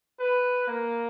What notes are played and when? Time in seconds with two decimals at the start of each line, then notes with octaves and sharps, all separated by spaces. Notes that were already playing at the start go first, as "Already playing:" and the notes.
0.19 B4
0.67 A#3